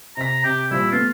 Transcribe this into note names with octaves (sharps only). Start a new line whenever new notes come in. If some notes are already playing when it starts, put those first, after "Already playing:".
C3 A#5 B6
C3 G4
A#2 F3 G3 E4
A3 B3 F4